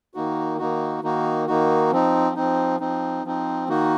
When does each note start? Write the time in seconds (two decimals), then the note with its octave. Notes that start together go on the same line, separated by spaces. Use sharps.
0.14 D#3 A#3 D#4 F#4
0.58 D#3 A#3 D#4 F#4
1.03 D#3 A#3 D#4 F#4
1.47 D#3 A#3 D#4 F#4
1.91 F3 C4 D#4
2.36 F3 C4 D#4
2.80 F3 C4 D#4
3.24 F3 C4 D#4
3.69 D#3 A#3 D#4 F#4